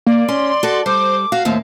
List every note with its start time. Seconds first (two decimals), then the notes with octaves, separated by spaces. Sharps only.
0.07 A#3 D5
0.29 C#4 C6
0.63 F#4 A4 C6
0.86 G3 C5 D6
1.32 F#4 F5
1.45 D#2 A2 C4